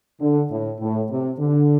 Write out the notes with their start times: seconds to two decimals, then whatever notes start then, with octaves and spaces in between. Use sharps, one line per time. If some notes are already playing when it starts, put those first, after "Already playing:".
0.20 D3
0.51 A2
0.80 A2
1.10 C3
1.39 D3